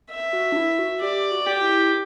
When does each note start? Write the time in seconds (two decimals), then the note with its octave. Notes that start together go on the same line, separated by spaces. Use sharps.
0.11 E5
0.33 F#4
0.52 D4
0.56 E4
0.79 F#4
1.01 G4 D5
1.31 F#4
1.46 G4
1.62 E4